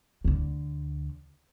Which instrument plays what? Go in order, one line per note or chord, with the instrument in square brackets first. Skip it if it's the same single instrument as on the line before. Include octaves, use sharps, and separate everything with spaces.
[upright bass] D2 D3